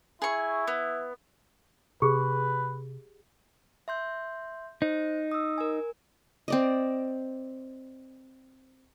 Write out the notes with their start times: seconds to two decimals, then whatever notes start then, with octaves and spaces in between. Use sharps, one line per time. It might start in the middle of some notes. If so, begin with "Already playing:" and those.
0.22 E4 G#4 C#6
0.68 B3
2.02 C3 G4 G#4 B4
3.88 E5 C6 G6
4.82 D#4 C5
5.32 D#6 E6
5.58 A#4 G#5
6.48 C4 D5 D#5